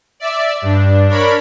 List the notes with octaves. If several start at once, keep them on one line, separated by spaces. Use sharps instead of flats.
D5 E5
G2 D4
D4 A#4 C#5 B5